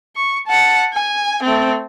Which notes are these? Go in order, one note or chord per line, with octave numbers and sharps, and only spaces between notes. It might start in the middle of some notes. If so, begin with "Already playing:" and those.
C#6
F#5 A5
G#5
A3 C4